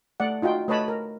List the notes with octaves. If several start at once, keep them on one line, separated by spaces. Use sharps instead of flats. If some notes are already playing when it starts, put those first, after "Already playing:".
A3 D5 F#5
D#4 F4 F#4 G5
A3 B4 C#5 D#5 A5 B5
A#4